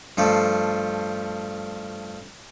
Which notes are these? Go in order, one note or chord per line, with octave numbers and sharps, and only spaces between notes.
G2 F3 A3 F5